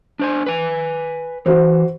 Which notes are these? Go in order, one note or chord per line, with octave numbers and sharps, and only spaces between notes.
D4 C5 G#5
B4 G#5
E3 F#4 C5